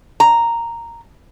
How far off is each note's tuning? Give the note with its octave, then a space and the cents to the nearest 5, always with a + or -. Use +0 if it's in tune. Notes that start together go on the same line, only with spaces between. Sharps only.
A#5 -5